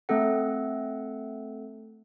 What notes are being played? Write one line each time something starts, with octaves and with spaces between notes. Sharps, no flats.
A3 C4 A4 F#5